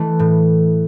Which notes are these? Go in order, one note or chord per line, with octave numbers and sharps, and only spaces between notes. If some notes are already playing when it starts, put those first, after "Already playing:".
Already playing: E3 A3
A2